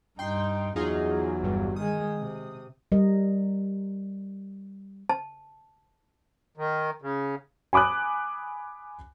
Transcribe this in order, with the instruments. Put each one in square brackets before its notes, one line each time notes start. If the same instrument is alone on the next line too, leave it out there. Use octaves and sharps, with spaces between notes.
[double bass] G2 D#4 [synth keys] G5 C6
[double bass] E2 F#3 [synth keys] D#4 F4 G#4
[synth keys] G1 G2
[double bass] D#3 G#3 [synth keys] D#6
[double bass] C3
[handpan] G3 A#4 D#5
[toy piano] A5
[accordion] D#3
C#3
[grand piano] G#5 B5 D6 D#6 F#6